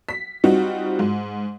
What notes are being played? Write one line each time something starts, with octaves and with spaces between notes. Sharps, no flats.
B6
G3 C4 D#4 F4 F#4
G#2